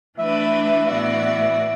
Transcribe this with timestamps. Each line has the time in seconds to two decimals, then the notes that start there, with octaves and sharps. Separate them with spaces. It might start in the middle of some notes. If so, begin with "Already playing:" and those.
0.19 E3 A3 D4 B4 E5
0.88 A2 E3 B3 F#4 D5 E5